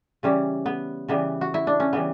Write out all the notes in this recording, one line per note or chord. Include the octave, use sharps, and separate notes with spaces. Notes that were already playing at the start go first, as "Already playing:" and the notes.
C#3 E3 G3 C#4
B3
C#3 E3 G3 B3
F#4
E4
D4
C#4
C#3 E3 G3 B3